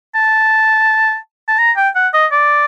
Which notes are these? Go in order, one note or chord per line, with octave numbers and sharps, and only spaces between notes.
A5
A5
A#5
G5
F#5
D#5
D5